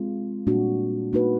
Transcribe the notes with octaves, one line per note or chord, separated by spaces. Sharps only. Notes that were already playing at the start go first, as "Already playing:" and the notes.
Already playing: G#3 C4 F4
A#2 G3 A#3 D4 F#4
A#3 D#4 F#4 B4